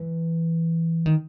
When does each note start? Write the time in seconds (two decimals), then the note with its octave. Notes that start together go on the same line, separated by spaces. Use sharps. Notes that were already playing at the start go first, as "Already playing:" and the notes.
Already playing: E3
1.06 D#3